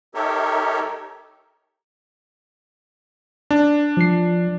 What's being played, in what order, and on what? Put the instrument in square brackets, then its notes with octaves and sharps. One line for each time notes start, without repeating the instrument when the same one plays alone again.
[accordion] D#4 G4 A4 A#4 C#5 E5
[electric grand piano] D4
[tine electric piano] F3 C7